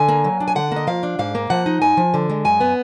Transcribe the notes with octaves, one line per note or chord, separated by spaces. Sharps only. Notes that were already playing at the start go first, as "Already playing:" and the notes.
Already playing: D3 G#5
A#3
F#3
D4
G#5
D3 F#5
A#3 D#5
F3 F5
D4
G#2 F5
A#3
F3 F#5
D#4
F#2 G#5
F3
D3
G#3
F#2 G#5
B3